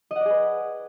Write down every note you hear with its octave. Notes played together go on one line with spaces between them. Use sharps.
G#4 B4 D5 D#5 F#5